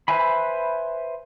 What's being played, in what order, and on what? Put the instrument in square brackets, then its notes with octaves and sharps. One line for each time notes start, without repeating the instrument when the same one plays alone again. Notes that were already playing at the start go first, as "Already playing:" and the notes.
[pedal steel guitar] B4 C5 E5 G#5 B5